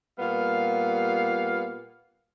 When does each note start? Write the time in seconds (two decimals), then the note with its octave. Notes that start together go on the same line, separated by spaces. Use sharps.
0.19 A#2 G3 B3 F5